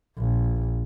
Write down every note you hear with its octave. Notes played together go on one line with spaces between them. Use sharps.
A#1